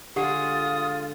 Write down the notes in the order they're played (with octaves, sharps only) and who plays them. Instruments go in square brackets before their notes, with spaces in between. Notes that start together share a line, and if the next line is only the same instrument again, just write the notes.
[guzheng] D3 G#3 [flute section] F4 [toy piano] G4 F#5 [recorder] D#6